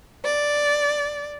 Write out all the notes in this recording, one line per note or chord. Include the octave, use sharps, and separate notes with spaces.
D5